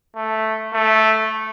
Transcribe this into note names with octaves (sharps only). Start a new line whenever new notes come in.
A3
A3